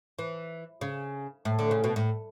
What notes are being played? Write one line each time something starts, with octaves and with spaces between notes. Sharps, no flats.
E3
C#3
A2
D3
C#3
B2
A2